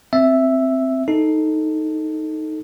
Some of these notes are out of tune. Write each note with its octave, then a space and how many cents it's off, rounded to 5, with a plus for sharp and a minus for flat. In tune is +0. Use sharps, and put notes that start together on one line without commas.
C4 +0 E5 +0
D#4 +5 A4 +0